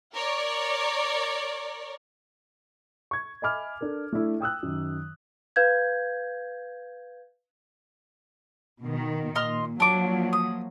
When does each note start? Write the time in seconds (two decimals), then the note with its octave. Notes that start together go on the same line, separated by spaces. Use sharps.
0.13 A#4 C#5 D5
3.11 C#6 G#6
3.42 D#5 E5 G#5 B5 D6 F6
3.81 D4 A4 A#4
4.13 A3 D4 E4
4.40 G5 D#6 E6 F#6
4.63 F#2 D#3
5.56 B4 F5 G6 G#6
8.83 B2 D#3
9.35 A#2 D#5 C6 F6
9.80 F3 F#3 A#3 D4 D6
10.33 D#6